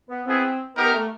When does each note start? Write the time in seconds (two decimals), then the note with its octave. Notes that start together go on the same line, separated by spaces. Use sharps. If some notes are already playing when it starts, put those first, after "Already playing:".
0.09 B3
0.25 B3 C4 E4 G#4
0.75 B3 D#4 G4 A#4
0.93 A3